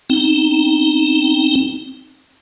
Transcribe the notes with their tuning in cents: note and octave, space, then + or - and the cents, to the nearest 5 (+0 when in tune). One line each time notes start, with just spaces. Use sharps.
C4 +0 D#4 -5